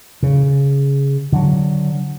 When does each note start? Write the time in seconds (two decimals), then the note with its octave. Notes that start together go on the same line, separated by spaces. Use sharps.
0.23 C#3
1.32 D3 F#3